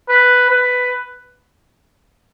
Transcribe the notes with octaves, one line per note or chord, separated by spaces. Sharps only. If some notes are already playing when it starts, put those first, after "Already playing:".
B4
B4